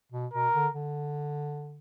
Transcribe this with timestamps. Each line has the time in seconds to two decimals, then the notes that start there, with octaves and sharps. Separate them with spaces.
0.12 B2
0.33 B2 A#4
0.54 D3
0.75 D3